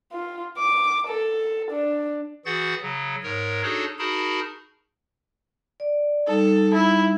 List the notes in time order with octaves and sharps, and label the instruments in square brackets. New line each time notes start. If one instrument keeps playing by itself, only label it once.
[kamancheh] F4
D6
A4
D4
[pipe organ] E3 F#4 G#4 F#5 G6 A6
C#3 F#3
G#2 A#4 C#5
D4 D#4 F#4 G#4 A4 C#5
D#4 F#4 G#4 A#4 A5 B5
[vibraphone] D5
[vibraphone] G3 D#4 [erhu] A4
[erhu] E4